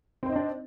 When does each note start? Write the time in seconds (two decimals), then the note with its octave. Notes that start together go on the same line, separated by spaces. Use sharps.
0.23 C4
0.26 C5
0.29 D#4
0.33 D#5
0.36 D4